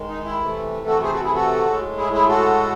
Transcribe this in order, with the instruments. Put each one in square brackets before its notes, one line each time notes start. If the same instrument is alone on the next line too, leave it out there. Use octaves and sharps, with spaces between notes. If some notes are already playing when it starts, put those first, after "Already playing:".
Already playing: [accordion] D#3 G#3
D#4
E4
C3 E3 A3
F#4 A4
G#4 C5
F#4 A4
E4 G#4
F#4 A4
A2 G#3
E4 G#4
E4 G#4
F#4 A4